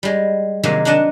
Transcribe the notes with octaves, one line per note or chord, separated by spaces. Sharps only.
G3 G#3
C3 D#3 F#3 G#3 A#3
D4 D#4 D#5 F#5 A5